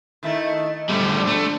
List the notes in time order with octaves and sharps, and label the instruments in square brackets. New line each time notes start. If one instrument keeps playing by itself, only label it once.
[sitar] D#3 A3 E4
[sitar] F2 D3 [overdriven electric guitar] G3 A3
[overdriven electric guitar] A3